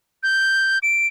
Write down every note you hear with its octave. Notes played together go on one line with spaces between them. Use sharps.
G6
D7